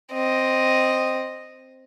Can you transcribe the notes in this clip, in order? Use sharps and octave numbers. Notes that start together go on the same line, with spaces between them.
C4 D#5